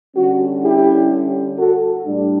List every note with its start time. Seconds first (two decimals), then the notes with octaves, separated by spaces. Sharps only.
0.15 D3 G3 C#4 F#4
0.62 E4 G4
1.58 F#4 A4
2.06 A2 G3 D4